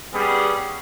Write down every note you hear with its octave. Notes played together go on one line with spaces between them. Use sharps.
G3 B3 C#4 G#4